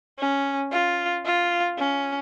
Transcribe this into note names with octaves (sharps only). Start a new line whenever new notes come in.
C#4
F4
F4
C#4